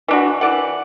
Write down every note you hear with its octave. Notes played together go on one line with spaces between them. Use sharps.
E3 D4 F#4
E3 D5 F#5